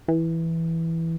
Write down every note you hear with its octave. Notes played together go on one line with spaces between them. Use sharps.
E3